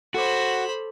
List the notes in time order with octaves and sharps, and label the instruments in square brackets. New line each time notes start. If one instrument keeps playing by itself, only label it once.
[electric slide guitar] F#4 [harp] A4 C#5 D6 [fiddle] C5 B5